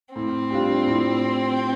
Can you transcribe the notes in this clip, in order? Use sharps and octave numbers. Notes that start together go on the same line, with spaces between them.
A2 C4
G3 D4 F4
A2